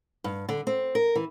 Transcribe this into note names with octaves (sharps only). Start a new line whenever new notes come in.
G2
D3
C4
A#4
E3